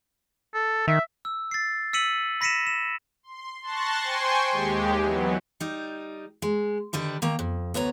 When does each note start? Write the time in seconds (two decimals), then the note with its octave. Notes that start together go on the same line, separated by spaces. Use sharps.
0.54 A4
0.87 D#3 E5
1.25 E6
1.51 A6 C7
1.93 E6 B6 C#7 D#7 F#7
2.41 B5 A#6 B6 C#7 D#7 E7
2.67 E7
3.23 C6
3.62 A5 C6 C#6 F#6 A6 A#6
4.02 C5 G5 G#5 C6 C#6
4.52 D#2 G#3 G4
5.01 E3 F#3 B3
5.60 G3 D#4
6.42 G#3
6.93 D3 D#3 G3 B4
7.22 D#3 A#3 A#5
7.39 F2
7.74 D2 B3 C#5 A#5